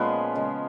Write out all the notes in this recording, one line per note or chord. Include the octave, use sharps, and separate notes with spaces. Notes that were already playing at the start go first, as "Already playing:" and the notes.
Already playing: A#2 F3 G#3 B3 C#4 F4
C#3 G#3